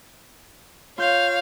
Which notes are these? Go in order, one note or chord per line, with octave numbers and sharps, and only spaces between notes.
F4 C#5 F5 G6